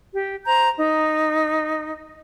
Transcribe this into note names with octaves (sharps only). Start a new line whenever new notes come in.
G4
C5 A#5 G6
D#4